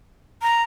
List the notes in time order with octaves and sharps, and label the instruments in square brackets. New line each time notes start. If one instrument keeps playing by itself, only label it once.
[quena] A#5